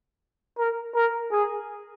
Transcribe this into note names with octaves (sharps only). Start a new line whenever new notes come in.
A#4
A#4
G#4